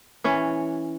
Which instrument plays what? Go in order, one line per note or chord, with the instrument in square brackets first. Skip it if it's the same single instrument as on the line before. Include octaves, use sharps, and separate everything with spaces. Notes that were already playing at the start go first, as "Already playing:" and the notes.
[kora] E3 C#4 C#5